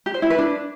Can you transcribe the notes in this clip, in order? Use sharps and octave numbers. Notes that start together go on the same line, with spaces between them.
G4
C5
E4
B4
D4